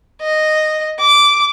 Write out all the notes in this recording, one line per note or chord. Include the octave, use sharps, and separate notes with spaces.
D#5
D6